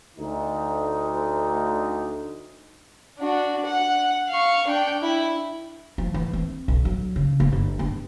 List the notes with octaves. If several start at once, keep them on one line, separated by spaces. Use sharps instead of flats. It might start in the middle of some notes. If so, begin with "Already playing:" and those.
D2 D#4
D4 F#4
F#5
F5 C#6
D4 G5
E4 E5
F3
E3
C4
B1
F#3
C#3
B3
G1
B3